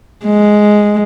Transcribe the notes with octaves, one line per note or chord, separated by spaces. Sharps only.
G#3